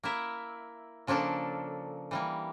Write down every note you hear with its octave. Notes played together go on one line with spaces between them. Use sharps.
A#3 E4 A#4 E5
C#3 F3 A#3 D4 A4
E3 G3 A#3